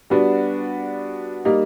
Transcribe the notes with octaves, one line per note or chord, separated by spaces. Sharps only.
G3 B3 D4 F#4
G3 A#3 D#4